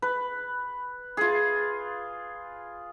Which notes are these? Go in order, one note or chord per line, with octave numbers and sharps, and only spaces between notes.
B4
F4 G#4